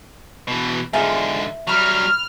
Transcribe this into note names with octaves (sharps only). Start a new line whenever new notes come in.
B2 E3
G#2 D3 D#4 F4 G#4 E5
F#3 G3 B5 C#6 F6